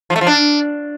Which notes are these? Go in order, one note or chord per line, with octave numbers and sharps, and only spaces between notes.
F3
A3
F3
D4